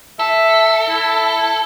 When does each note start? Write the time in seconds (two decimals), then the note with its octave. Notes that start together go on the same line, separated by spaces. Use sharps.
0.19 A4 E5
0.89 E4